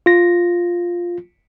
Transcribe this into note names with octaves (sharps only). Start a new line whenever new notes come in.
F4 A#6